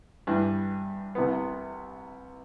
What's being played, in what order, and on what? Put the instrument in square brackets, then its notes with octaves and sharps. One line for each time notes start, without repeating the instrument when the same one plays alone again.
[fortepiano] G2 E3 G3
C2 C3 E3 B3